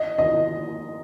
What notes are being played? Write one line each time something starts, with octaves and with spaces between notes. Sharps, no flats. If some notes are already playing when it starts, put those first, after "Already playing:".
Already playing: D#5
D#5